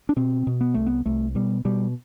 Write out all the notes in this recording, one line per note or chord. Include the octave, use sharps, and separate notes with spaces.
D4
B2 C4
B2
B3
C2 A3
B3
C2 A3
B2 G3
B2 G3